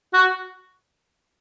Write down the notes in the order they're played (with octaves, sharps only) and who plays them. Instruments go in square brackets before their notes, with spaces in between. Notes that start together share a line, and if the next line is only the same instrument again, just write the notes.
[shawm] F#4